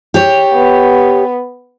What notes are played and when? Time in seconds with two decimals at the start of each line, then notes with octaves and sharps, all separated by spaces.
0.14 G4 C#5
0.54 B3